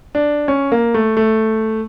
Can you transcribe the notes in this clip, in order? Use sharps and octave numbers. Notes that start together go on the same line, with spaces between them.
D4
C#4
A#3
A3
A3